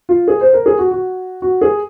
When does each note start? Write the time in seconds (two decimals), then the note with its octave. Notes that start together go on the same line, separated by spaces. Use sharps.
0.09 F4
0.28 G#4
0.41 C5
0.53 A#4
0.66 G#4
0.79 F#4
0.91 F#4
1.42 F#4
1.62 G#4